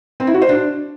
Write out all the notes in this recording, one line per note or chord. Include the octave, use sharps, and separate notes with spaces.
C4
E4
F#4
C5
D4